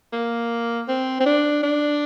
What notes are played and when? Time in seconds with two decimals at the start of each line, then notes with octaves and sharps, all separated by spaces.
0.13 A#3
0.88 C4
1.20 C4
1.26 D4
1.63 D4